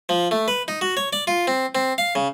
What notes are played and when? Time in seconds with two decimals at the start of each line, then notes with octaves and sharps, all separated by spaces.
0.09 F3
0.31 A3
0.48 B4
0.68 D#4
0.81 F#4
0.97 C#5
1.13 D5
1.27 F4
1.47 C4
1.75 C4
1.98 F5
2.15 C#3